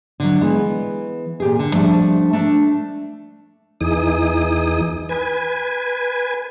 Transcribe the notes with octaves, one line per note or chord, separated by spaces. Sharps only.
D3 F#3
E3 G#3 B3
A#2 G4 G#4
D3
F3 G3 A3 D4
A3 D4
E2 E3 D#4 G#4 D#6
B4 G#5